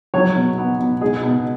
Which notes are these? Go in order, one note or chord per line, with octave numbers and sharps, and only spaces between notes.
F#3 C#5
B2
B3
B2
G#3 G#4
B2